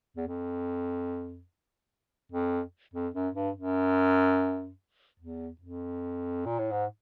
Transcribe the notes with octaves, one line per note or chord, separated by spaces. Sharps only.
E2
F2
F2
F2
F#2
G2
F#2
E2
F2
A#2
A2
G#2